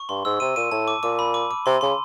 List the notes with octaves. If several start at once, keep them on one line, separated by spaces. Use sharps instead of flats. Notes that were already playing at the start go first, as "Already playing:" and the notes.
Already playing: C#6
G2 C6
G#2 E6
C3 D#7
A#2 D#7
A2 A5
D6
A#2 D6
B5
D6
D6
C3 C6
C#3 C6